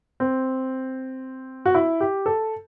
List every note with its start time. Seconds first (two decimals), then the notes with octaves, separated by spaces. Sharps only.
0.20 C4
1.66 F#4
1.75 E4
2.01 G4
2.26 A4